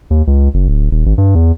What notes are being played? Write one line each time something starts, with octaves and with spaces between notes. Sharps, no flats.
D#2
C#2
F#1
D1
D#1
G#1
G2
E2